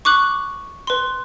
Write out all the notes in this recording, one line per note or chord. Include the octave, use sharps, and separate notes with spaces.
C#6 D6 F#6 F#7
B4 C6